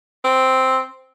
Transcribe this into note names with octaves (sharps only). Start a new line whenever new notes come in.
C4